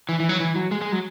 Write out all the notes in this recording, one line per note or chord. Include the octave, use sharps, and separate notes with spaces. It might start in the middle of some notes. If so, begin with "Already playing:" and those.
E3
E3
F#3
E3
F#3
G#3
G#3
F#3